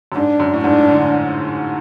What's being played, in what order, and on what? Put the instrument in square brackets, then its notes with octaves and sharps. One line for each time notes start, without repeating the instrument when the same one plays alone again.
[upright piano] F#2
[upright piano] G#2 [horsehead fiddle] D4
[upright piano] F#2
A2
[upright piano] G#2 [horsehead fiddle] D4
[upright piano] D3